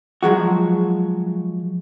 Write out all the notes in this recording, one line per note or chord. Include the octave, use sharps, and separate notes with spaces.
F3 F#3 G#3 F#4